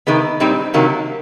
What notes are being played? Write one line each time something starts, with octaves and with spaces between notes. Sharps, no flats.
C3 D#3 G#3 B3
A#2 G3 C4 D#4
C3 D#3 F#3 A#3